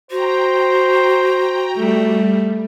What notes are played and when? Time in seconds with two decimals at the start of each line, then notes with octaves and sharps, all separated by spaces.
0.11 F#4 C5 G5 A#5
1.77 G3 A3